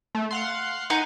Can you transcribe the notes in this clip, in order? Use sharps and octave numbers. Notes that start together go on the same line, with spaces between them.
A3
F5 F#5 C6
D#4 F#5 G#5